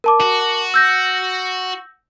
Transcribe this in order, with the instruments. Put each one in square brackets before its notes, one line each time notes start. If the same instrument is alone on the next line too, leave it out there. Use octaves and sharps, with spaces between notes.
[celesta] A#4 A5 D6
[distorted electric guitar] F#4
[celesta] E6 G6 A#6